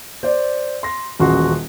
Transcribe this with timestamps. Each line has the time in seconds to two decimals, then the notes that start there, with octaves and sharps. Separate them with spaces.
0.23 C5 D5
0.83 C6 A#6
1.19 D#1 A1 F#4 G#4 C6